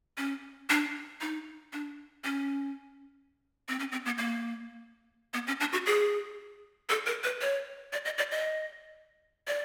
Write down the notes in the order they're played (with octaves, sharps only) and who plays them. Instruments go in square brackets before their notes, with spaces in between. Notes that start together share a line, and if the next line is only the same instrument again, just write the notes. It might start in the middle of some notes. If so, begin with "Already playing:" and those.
[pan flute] C#4
D4
D#4
D4
C#4
C4
C#4
C4
B3
A#3
B3
C#4
D4
F#4
G#4
A4
A#4
B4
C#5
D5
D#5
D5
D#5
D5